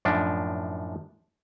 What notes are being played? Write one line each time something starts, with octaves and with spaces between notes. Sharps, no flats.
F#2 A2 F3 D4 D#4